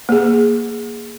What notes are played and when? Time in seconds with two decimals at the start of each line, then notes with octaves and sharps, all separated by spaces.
0.09 A#3 G#4